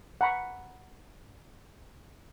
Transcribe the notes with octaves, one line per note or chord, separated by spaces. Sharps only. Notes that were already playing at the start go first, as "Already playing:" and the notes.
F#5 A#5 B5 C#6